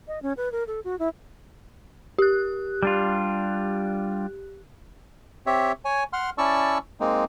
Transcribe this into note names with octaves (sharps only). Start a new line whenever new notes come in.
D#5
C#4
B4
A#4
A4
F#4
E4
G4 F#6
G3 D4 F4
C4 G4 C#5 E5
C#5 G#5
F#5 C6 F6
C#4 E4 D5 A5 C#6 E6
G#3 A#3 C4 D#4